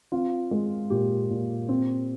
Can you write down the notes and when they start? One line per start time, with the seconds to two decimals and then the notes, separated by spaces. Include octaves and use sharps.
0.12 C4 F4
0.51 G#3
0.90 A#2 G4
1.30 A#2
1.69 C4